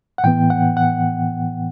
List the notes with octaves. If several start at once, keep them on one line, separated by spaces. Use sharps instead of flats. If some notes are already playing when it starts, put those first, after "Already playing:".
F#5
A2 E3 B3 G5
F#5
F#5